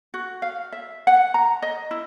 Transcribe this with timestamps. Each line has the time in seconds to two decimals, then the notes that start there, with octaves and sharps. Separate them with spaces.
0.14 F#4
0.42 F5
0.72 E5
1.07 F#5
1.34 A#5
1.62 D#5
1.91 E4